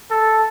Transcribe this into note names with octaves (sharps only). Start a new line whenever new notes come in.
A4